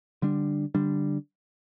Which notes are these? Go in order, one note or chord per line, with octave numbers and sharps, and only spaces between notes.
D3 G3 D4
D3 G3 D4